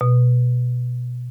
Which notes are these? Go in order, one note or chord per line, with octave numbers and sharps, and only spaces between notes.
B2